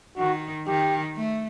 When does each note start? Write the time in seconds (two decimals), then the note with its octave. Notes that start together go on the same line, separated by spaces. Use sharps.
0.18 D#3 F#4
0.67 D#3 G4
1.16 A3